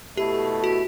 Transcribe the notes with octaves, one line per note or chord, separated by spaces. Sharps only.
B2 A3 E4 G4 A4
F#4